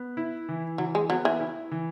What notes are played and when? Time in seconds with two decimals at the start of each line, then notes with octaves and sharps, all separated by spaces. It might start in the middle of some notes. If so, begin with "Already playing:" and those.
Already playing: B3
0.17 E4
0.49 E3
0.78 E3 F#3
0.95 G#3
1.10 F#3 B3
1.25 E3
1.40 E4
1.72 E3